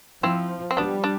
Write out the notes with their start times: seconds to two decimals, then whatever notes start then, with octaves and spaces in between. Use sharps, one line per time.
0.23 F3 C4 E4
0.71 C4
0.77 G3 B3 D4
1.04 D4